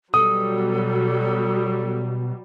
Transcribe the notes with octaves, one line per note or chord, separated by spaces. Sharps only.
B2 F#3 G3 A4 D#6